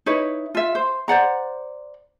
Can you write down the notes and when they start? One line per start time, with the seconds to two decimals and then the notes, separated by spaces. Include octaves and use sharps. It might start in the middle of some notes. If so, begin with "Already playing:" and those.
0.06 D#4 E4 B4 C#5
0.55 F4 E5
0.75 C5
1.08 C5 D5 F#5 A#5